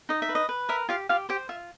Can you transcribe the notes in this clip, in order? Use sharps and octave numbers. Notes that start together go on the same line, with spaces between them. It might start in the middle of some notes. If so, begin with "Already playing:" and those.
D#4 D#5
E5
B4
D#5
B4
A#4 E5
F4 G4 F5
F4 G4 F5
G4 C5 G5
F4 E5